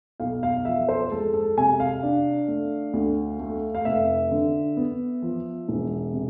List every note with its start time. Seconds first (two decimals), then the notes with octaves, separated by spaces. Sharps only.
0.20 B1 F5
0.43 F5
0.65 F3 E5
0.89 C5
1.11 G#3 A4
1.34 A4
1.57 C3 G#5
1.80 F5
2.03 D4
2.48 A3
2.93 D2
3.40 A3
3.75 F5
3.85 F1 E5
4.32 D3
4.77 B3
5.22 F3
5.69 E1
6.13 C3